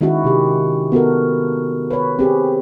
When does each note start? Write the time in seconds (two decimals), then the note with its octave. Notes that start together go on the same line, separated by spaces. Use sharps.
0.01 D#3 G#3 C#4 E4 F#4
0.24 C3 G4
0.92 B3 F#4 A4 A#4
1.90 B4 C#5
2.19 C4 G4 G#4